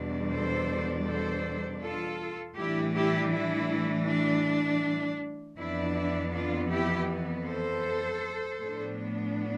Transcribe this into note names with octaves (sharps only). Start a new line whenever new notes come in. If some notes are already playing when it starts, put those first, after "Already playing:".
Already playing: E2 B2 G3 D4
A4 C5
A4 C5
F4 A4
A2 E3 G3 D4 E4 G4
E4 G4
E4
D4
F2 E3 B3 D4 E4
E4
D4 F4
E4 G4
A4 C5
A2 F3 B3 D4